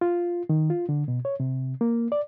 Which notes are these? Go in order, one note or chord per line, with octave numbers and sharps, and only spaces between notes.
F4
D#3
F4
D3
B2
C#5
C3
A#3
D5